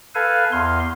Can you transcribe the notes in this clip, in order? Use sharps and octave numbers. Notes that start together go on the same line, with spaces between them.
A4 B4 F5 G#5
E2 F5 C6